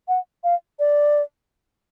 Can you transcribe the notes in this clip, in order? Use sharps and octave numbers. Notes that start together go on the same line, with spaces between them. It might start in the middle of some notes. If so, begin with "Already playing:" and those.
F#5
F5
D5